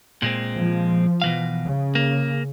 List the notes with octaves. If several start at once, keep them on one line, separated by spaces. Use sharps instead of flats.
A#2 G#3 C4
F3
B2 E3 F5
C#3
A#3